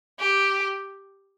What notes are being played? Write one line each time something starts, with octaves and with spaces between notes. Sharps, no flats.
G4